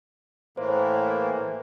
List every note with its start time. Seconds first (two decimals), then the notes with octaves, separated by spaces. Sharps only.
0.57 A2 E3 A#3 C5